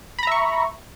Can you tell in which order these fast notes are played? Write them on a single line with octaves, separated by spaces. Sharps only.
B5 A#5 E5 C#6